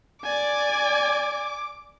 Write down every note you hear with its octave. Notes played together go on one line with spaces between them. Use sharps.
D5 G#5 D6